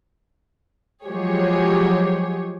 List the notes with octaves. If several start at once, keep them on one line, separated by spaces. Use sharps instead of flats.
F3 F#3 G#3 G4 G#4 C#5